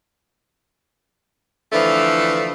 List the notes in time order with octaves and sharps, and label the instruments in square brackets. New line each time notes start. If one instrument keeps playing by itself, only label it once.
[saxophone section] D3 E3 F3 A3